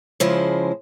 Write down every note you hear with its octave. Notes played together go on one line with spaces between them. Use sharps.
C#3 F3 G#3 E4 C5